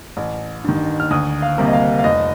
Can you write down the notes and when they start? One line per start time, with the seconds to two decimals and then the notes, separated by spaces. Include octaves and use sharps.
0.17 A1
0.64 G2 D#3
1.00 F6
1.11 D2 D#6
1.42 F5
1.58 C3 G3 A#3
1.66 D#5
1.73 F5
1.99 F5
2.04 F1 D#5